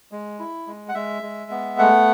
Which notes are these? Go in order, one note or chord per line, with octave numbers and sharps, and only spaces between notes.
G#3
E4
G#3
F#5
G#3 E5
G#3
B3
A3 F#5